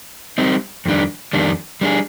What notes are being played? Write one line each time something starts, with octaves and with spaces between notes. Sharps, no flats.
G3 C4 D#4
F2 D#3 G3 D4
F2 D#3 G3 D4
G3 D4 G#4